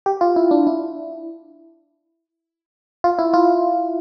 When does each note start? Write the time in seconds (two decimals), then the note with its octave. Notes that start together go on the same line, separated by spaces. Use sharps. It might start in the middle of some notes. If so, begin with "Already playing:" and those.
0.06 G4
0.21 F4
0.36 E4
0.51 D4
0.67 E4
3.04 F4
3.19 E4
3.34 F4